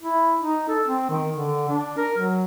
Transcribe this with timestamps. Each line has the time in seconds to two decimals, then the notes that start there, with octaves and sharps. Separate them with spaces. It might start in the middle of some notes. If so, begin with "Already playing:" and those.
0.02 E4
0.40 D#4
0.69 A4
0.87 C4
1.10 D#3
1.34 D3
1.69 D4
1.97 A#4
2.18 F#3